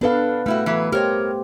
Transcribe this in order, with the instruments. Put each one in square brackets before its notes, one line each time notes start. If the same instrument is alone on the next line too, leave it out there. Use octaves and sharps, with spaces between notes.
[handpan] B3 B4 F5 [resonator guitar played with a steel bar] D4 A4
[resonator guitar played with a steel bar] G3 E4 F#4 [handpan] A3
[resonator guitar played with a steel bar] E3 F#3 B4
[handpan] G4 C5 [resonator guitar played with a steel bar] A#4 C#5 D#5